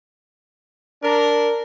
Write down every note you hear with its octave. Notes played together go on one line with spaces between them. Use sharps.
D4 A#4